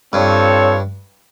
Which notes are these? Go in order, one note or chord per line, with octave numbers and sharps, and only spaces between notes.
G2 C4 F4 A4 C#5